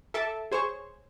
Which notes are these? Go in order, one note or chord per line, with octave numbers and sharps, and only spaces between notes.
A4 E5 A5 D6
G#4 C5 C#5 C#6